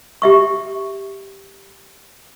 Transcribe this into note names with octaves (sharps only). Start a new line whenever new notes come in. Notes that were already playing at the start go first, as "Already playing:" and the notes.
G4 E5 C#6